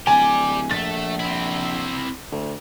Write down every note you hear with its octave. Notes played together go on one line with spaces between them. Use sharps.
D1 G4 D5 G#5
A#1 A3 A4 A6
C4 E4
D2